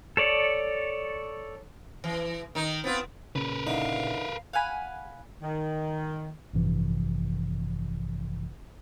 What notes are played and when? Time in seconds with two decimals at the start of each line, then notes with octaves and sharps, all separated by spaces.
0.17 A4 C#5 D5
2.04 E3
2.55 D#3 D#4
2.84 B3 C4 F4
3.36 A#2 C#3 A#4 B4
3.67 D3 E3 D#4 F5
4.53 F5 F#5 G#5 B5
5.42 D#3
6.54 A1 G2 C3 E3 F3